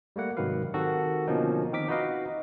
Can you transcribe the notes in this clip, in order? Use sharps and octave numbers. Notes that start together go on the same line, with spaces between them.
G3 A3 A#3 F#5
G#2 C3 D#3 F#3 B4 F5
D#3 C4 F#4 G4 A4 A#4
B2 D3 F3 A#3 C#4 D#4
D#3 C4 A#4 D6 B6
D#4 F#4 B4 D#5 F5